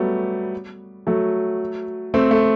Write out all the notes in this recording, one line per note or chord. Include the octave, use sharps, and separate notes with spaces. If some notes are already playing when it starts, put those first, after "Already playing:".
Already playing: F#3 G3 A3 B3
F#3 A3
A3 C4
A3